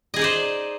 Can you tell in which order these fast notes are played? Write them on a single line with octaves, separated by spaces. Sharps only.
D#5 G#4 D#4 D5 C5